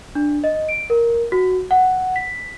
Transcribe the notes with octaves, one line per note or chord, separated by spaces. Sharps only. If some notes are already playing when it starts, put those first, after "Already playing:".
D4
D#5
D7
A#4
F#4
F#5
B6